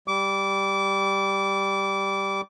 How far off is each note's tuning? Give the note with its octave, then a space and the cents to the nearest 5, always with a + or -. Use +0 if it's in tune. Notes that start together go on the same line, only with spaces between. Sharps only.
G3 +0 D6 -25